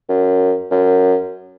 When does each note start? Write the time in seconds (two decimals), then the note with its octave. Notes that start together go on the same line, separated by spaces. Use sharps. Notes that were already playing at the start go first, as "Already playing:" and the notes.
0.09 F#2
0.71 F#2